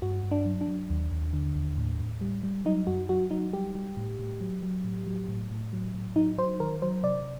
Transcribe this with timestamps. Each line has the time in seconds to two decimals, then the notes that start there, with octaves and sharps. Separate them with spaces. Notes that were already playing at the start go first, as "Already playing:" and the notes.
0.02 G2 F#4
0.24 G2
0.31 D4
0.45 F#3
0.61 D4
0.68 F#3
0.90 D#2
1.12 D#2
1.33 D3
1.56 D#2
1.78 A2
2.00 A2
2.21 G3
2.43 G3
2.65 F#3 D#4
2.87 F#2 F#4
3.09 F#3 F#4
3.31 F#3 D#4
3.53 G3 G4
3.75 G3
3.97 A2
4.19 A2
4.41 F#3
4.62 F#3
4.84 A2
5.07 F#3
5.28 A2
5.51 A2
5.73 F#3
5.94 A2
6.16 F#3 D#4
6.38 F#3 C5
6.60 D#3 A#4
6.82 F#3 C5
7.04 C3 D5